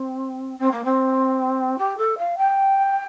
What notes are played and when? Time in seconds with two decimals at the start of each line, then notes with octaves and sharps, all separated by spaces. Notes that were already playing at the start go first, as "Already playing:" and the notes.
Already playing: C4
0.58 C4
0.71 A#3
0.84 C4
1.78 G4
1.97 A4
2.17 F5
2.37 G5